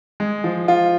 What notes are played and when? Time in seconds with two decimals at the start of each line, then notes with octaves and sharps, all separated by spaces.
0.20 G#3
0.44 F3
0.68 F4